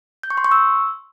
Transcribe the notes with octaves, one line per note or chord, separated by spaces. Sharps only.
G6
C#6
C6
C#6
E6